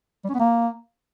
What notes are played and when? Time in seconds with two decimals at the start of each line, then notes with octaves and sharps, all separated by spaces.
0.24 G3
0.29 C#4
0.34 B3
0.39 A#3